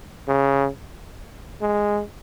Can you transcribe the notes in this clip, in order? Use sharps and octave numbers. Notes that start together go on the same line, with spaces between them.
C#3
G#3